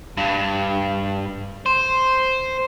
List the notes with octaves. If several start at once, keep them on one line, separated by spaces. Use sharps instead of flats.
G2
C5